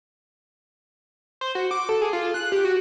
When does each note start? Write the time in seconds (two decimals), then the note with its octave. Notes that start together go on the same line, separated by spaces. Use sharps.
1.41 C5
1.55 F#4
1.71 D6
1.89 A4
2.02 G#4
2.13 F4
2.34 F#6
2.52 G4
2.65 F#4